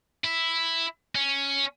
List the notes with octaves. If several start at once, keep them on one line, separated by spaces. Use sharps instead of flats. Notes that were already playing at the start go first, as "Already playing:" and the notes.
E4
C#4